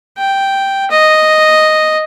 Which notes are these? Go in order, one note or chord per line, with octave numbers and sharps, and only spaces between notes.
G5
D#5